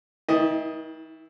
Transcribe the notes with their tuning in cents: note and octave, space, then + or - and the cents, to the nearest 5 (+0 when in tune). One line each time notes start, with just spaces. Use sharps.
D#3 +45 E4 -10 D#5 +0